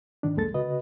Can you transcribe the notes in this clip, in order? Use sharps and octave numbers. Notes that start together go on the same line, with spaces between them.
G#2 D#3 D4
C2 F2 G#3 A#3 A4 A6
C#3 F#4 B4 D#5